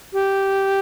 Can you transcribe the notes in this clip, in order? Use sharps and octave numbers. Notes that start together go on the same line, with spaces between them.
G4